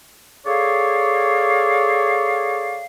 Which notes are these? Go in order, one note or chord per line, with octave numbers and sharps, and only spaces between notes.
G#4 A4 C#5 D5 F5